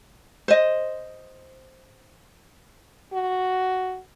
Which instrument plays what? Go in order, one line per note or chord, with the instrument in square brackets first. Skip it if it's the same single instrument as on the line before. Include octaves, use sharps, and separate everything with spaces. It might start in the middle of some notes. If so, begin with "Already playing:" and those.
[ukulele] C5 D#5
[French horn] F#4